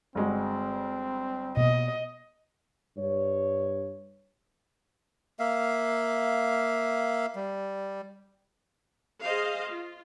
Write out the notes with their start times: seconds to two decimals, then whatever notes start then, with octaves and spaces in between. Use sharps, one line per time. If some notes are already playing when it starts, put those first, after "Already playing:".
0.15 G1 G#3 C4 F#4
1.57 B2 A#3 B3 D#5
2.97 G2 C#5
5.39 A#3 E5 F5
7.35 G3
9.21 G#4 C5 D#5 F5
9.69 F4